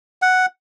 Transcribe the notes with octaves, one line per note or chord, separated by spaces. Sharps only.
F#5